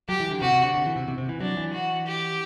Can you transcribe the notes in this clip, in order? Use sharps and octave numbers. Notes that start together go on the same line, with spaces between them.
F#3 G4
E3
D3
C3 F#4
C3
D3
D3
E3
C3
C3
C3
E3
F#3 D4
E3
F#4
G4